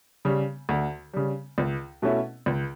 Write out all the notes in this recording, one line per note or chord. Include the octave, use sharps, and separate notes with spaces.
C#3 G3
D2
C#3 G3
C#2
B2 A3 C#4 E4
C#2